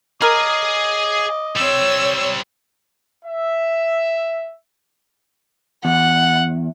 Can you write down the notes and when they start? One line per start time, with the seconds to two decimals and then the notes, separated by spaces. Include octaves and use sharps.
0.22 G#4 A#4 D#5 G#5 D6
1.56 G3 C4 C#5 E6
3.25 E5
5.85 E2 F#5